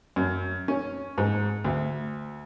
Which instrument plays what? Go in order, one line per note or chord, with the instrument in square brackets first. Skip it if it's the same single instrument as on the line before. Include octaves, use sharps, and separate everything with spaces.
[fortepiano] F#2
C#4
G#2
D2